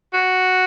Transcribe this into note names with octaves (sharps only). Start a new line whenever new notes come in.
F#4